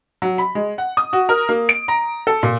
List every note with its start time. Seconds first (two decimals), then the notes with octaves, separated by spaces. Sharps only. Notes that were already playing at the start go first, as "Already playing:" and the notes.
0.22 F#3
0.38 B5
0.55 G#3
0.78 F#5
0.97 D#6
1.13 F#4
1.29 A#4
1.49 A#3
1.69 D7
1.88 A#5
2.27 A4
2.43 A#2